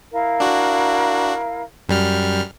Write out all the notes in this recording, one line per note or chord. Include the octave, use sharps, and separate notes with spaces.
E4 A#4 F5
D4 F#4
F#2 G3 F6